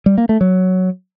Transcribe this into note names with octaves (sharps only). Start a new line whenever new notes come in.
G3
A#3
A3
F#3